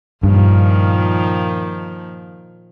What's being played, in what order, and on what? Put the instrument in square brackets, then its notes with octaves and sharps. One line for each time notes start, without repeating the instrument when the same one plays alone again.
[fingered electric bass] G2 [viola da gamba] A#2 D#3 F3